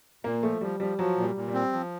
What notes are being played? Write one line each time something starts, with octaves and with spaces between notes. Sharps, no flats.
A#2 A#3
F3 A3
F3 G3
F3 G3
F3 F#3
A#2
G3
A#2
G3
C4
F3